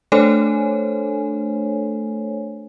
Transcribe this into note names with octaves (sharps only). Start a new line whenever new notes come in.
A3 D4 A4 C5 C#5 G#5